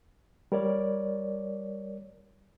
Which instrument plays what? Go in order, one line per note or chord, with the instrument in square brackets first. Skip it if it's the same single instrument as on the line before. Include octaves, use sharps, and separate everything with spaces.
[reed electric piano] G3 A#4 C#5 D5